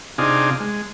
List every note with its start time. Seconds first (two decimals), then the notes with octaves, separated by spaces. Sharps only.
0.18 C3 D4 D#4 F4 G#4
0.60 G#3